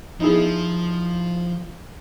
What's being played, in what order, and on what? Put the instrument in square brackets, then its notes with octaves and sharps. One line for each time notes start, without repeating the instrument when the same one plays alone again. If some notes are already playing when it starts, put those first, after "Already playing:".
[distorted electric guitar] F3 [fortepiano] D#4 E4 G#4